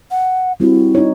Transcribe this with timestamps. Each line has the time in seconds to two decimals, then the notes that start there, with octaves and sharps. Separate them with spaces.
0.11 F#5
0.60 G3 C4 E4 F#4
0.95 D#4 C#5